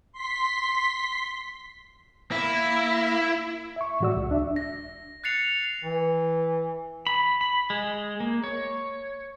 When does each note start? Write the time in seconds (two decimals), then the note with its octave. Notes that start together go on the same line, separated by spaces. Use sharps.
0.12 C6 B6
2.32 A#3 E4
3.76 E5 C#6
4.00 A2 E3 G#3 F#4 D5 E6
4.17 C#2
4.31 D4 E5
4.56 A#6
5.24 F#6 A6 C7 C#7 F7
5.83 E3
7.07 B5
7.41 B5
7.70 G#3
8.20 A#3
8.44 C#5